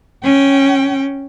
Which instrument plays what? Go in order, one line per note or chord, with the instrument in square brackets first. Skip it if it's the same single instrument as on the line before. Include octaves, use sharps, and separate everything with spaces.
[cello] C#4 G5